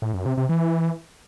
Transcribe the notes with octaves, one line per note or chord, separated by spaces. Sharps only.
A2
F#2
C3
C3
E3